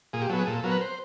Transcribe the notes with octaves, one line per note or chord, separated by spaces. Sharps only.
A#2 G#4
G4
F#3 B3 A4
G#4
A#2 A4
F#3 B3 A#4
B4
C5